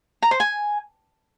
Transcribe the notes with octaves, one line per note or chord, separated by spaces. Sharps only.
A#5
C5
G#5